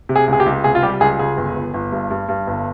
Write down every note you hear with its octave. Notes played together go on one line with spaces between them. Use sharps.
C3
G#4
C#2
G#4
G4
C#2
C3 G#4
F4
G3 G4
C#2 G#4
C#2 G#4
G1
G1
G1
G2
G2
G2
G1